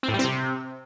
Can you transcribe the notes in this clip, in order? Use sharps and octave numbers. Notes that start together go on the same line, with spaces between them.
C4
A2
G3
C4
C3